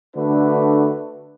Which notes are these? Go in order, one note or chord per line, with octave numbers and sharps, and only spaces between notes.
D3 A3 D4 F#4 B4